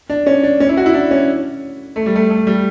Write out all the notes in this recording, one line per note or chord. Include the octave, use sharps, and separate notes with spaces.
D4
C#4
D4
C#4
E4
F#4
E4
D4
C#4
A3
G3
A3
A3
G3